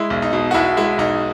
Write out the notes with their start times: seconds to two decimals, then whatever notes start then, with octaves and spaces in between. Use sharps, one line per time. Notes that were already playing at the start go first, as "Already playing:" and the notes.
Already playing: G#3 E4
0.10 B1
0.22 D#4
0.33 B2
0.51 F#4
0.54 B1 E4
0.77 G#3 E4
0.98 B1 D#4